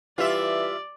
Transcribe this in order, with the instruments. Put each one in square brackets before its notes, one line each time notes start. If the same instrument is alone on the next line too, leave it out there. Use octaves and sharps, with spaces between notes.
[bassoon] E3 [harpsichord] G3 [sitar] F4 E5 [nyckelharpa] D5